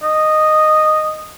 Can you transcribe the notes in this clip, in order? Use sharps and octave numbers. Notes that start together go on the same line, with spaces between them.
D#5